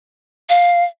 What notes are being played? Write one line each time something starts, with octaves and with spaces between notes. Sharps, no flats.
F5